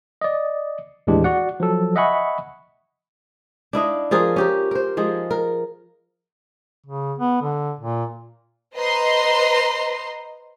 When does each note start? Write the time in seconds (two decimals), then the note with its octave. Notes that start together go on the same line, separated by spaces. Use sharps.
0.21 D5 D#5
1.07 D#2 A2 E3 G#3 D4 G4
1.24 F#4 D5 F#5
1.60 F3 F#3 A4
1.96 D#5 E5 F#5 G#5 B5 C#6
3.73 D4 E4 D#5 F5
4.11 F3 F4 G#4 A#4
4.36 C#4 G4 A#4
4.71 A#4 C5
4.97 F3 G#3 G#4
5.31 A#4
6.86 C#3
7.19 B3
7.42 D3
7.80 A#2
8.77 B4 C5 D#5 A#5 C6